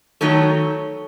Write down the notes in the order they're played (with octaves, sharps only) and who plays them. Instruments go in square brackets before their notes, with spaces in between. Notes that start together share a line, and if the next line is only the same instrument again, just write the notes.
[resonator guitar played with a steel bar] D#3 F#3 A3 D#4 A4 C#5